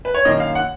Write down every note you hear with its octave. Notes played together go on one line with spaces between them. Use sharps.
B4
C#5
F#2 D#3 A#3 D#5
F5
F#5